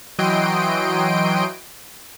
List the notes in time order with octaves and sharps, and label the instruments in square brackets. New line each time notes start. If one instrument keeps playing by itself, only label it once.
[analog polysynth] E3 F#3 D#5 G5 C6 D7